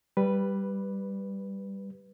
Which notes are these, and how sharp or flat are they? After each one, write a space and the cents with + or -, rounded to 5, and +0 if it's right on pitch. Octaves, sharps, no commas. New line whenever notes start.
G3 +0 B4 +0